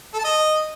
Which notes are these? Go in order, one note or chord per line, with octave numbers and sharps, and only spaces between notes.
A4
A5
D#5